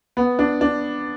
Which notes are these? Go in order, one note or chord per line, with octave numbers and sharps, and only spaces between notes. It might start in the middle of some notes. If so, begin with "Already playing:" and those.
B3
D4
D4